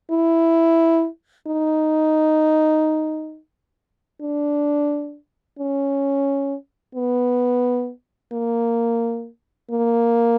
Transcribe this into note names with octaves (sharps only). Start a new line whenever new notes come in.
E4
D#4
D4
C#4
B3
A#3
A#3